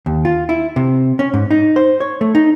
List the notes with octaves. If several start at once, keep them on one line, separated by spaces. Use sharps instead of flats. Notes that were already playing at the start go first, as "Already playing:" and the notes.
D#2
F4
E4
C3
C#4
G#2
D#4
C5
C#5
A3
D#4